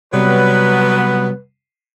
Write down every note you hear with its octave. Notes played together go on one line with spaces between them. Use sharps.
C3 F#3 G3 B3 B4